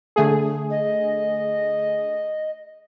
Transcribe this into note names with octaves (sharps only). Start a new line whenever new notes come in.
D3 A3 G#4
D#5